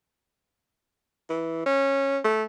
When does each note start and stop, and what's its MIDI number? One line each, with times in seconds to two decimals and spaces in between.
1.30 1.63 52
1.66 2.19 61
2.25 2.43 57